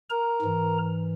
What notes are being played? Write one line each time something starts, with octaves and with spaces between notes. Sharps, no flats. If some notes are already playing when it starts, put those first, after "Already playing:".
A#4 A#5
G#2 E3